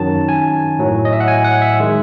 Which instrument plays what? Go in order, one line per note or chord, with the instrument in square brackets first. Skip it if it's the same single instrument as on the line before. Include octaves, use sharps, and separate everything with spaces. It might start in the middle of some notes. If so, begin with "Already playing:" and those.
Already playing: [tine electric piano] F#2 D#3 F#3 A5
G#5
A2 F#3
D#5
E5
F#5
G#5
F#5
E5
D#3 G#3